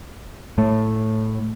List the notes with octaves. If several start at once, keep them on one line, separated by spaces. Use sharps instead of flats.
A2 A3